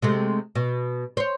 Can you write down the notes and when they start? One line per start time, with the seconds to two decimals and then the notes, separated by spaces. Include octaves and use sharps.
0.02 C3 G#3 A3
0.55 B2
1.17 C5 C#5